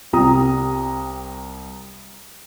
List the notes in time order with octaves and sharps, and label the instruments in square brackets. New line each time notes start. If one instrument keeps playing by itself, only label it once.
[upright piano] C2 G3 A#5 D#6